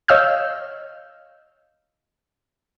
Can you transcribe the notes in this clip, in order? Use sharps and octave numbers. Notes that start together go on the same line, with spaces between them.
C#5 D#5 F5 E6 F6 G6